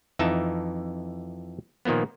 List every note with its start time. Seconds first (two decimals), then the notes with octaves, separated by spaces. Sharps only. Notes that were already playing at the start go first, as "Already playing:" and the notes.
0.19 F2 E3 D#4 E5 A5
1.85 A#2 D#3 F3 A#3 B3